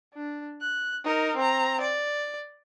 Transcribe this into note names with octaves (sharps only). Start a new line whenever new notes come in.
D4
F#6
D#4 A#4
C4 A#5
D5